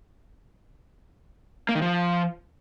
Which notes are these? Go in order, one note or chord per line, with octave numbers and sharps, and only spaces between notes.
A#3
D#3
F3